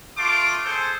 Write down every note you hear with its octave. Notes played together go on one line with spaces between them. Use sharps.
A3 F4 C6 D6
G#4 A4 C5